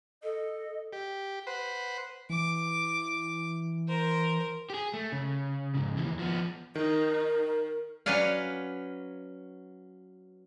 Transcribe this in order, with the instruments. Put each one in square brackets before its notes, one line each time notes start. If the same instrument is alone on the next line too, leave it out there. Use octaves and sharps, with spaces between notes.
[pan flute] A4 [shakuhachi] D#5
[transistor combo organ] G4
B4 C5 F#5
[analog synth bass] E3 [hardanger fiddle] D6
[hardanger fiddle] A#4 C5
[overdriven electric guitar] G4 G#4
A3
C#3
G#2 C#3
D#2 E3
F3 B3
[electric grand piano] D#3 [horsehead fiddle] D#4 [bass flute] A#4
[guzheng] F#3 C#4 B4 C#5 D5 F5